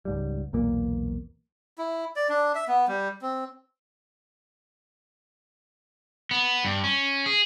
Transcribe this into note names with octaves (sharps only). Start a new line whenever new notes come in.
C#2 G#2 G3
B1 E2 A#2 A#3
E4
D5
D4
E5
B3
G3
C4
B3
G2
C#4
G#4